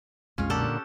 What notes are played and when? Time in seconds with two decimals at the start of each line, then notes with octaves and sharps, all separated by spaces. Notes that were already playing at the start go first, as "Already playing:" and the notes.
0.38 B1 F2 G#3 C#4 F4
0.50 A#2 D3 G4 A4 F#5